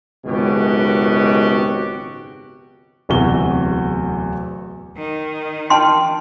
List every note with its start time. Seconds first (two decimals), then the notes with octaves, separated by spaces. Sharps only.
0.26 G#1 C#2 F#2 B2 F#4 G4
3.09 D1 E2 C3 F#4 G7
4.98 D#3
5.70 G5 A5 C6 F6